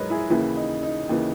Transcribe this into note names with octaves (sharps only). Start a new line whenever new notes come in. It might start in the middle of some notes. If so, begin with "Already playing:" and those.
Already playing: G#2 F#3 A#4 B4 C#5 D#5
E4 G#4
D#2 C#3 E3 E4
D#4
D#4
D#2 C#3 E3